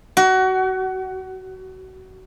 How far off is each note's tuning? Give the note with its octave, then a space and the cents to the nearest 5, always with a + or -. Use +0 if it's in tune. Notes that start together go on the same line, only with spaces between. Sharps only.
F#4 +25